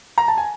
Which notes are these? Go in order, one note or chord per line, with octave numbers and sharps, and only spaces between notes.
A#5
A5
G#5